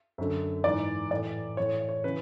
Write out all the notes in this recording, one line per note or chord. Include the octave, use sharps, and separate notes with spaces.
F#2 D3
G#2 E3 D5
A2 E3 D5
A2 E3 C#5
C#5
C#3 E3 B4